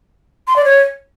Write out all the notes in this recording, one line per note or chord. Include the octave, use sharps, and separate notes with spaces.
C6
D5
C#5